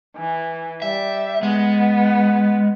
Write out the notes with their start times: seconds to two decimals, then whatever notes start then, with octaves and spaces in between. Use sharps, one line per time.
0.17 E3
0.82 G3 E5
1.43 G#3 B3